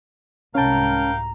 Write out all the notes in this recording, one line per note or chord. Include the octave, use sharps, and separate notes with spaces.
C2 G#2 C#4 A#4 F5 G5 A5 A#5